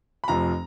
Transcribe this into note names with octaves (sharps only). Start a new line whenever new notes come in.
B5
F1 F2 F3 A#5